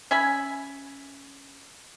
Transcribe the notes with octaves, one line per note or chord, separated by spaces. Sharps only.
C#4 E5 G#5 B5